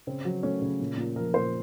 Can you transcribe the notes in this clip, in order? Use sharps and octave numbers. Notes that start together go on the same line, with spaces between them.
C#3 C4
F#3
A3 C#4
C#3
A#2
A#2
F3 A#4
A#2 C5